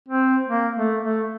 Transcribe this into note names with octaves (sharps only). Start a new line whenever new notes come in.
C4
A#3
A3
A3